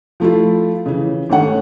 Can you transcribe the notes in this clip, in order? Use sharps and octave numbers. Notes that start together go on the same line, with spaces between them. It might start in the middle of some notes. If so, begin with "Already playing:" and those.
F3 A3 E4 F4
C#3 E3
G#1 A3 C#4 F#5